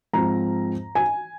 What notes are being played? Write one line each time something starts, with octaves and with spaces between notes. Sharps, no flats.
G#2 F3 C4 F4 A#5
G#5